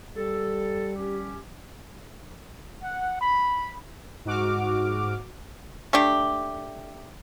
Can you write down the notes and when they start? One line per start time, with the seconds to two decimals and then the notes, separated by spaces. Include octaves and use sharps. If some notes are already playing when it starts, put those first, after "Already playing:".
0.17 G3 A4
0.95 C#4 G4
2.82 F#5
3.21 B5
4.25 G#2 F#4 D6 F6
5.93 A3 D4 G4